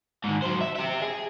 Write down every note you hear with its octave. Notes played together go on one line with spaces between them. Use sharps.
G#2 D#3
F#3 C5
E5
G4 E5
G#4